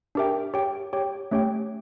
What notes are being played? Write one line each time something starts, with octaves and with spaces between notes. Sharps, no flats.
D4 G4 A#4 E5 G5
G4 C#5 G5
G4 C#5 G5
A3 C#4 G4 C#5 G5